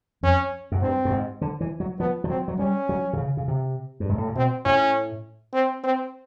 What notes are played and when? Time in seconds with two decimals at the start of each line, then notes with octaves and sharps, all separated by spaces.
0.23 F2 C#4
0.72 F#2
0.81 G2 C4
1.05 G2
1.11 G#2
1.41 D3
1.60 E3
1.80 F#3
1.99 F3 B3
2.24 F3
2.29 F#3 C4
2.48 F#3
2.59 G3 C#4
2.89 F#3
3.13 C3
3.18 C#3
3.37 C#3
3.48 C3
4.00 G2
4.09 G#2
4.18 A2
4.27 A#2
4.36 B2 C4
4.65 A2 C#4
5.54 C4
5.84 C4